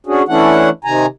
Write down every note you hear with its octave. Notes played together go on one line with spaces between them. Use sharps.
C#4 D4 F#4 G#4
E3 A3 C#4 D4 E4 F#5
C3 D#3 G#5 A#5